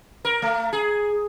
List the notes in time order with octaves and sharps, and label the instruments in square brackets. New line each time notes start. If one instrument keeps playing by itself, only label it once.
[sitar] A#4
A3
G#4